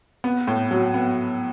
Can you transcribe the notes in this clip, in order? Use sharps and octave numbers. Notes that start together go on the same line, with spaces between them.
B3
A2
F#3
B3